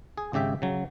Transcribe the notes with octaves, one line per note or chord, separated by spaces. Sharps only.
G#4
G#1 C#3 G4 E5 G5
C#3 F#3